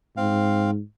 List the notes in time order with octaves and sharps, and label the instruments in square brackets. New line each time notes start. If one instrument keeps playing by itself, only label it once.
[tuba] G#2 [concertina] C4 F5